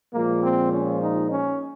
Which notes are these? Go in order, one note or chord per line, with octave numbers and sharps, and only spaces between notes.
A#2 F3 G#3 A#3
C4
C#4
D#4
C#4